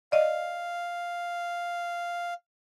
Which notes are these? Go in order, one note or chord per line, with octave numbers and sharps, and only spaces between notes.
D5 D#5 F5